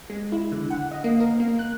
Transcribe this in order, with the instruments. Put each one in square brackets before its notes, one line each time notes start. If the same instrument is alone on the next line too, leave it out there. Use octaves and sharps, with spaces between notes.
[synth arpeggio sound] G#3
E4
D3
F#5
D#5
A#3
A#4
A#3
F#6